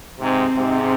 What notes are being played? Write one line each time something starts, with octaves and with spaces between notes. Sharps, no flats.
G#2 C3 C4
G#2 C3